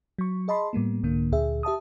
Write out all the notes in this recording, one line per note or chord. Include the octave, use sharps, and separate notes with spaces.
F#3 C#6
G#4 D#5 A5 B5 C6
A2 G3 A#3 B3
C2 G#2 D3 A#3
D2 A#2 D3 G#4 E5
G4 E5 A5 D#6